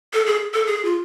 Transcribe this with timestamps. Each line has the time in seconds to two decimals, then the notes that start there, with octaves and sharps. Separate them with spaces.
0.13 A4
0.27 G#4
0.54 A4
0.67 G#4
0.85 F4